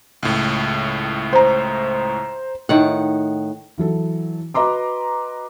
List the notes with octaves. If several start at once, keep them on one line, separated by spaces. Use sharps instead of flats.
C#2 A2
C5 A#5
A2 D#3 F#5
E3 F#3 A4
F#4 B4 D#5 A#5 C6 D6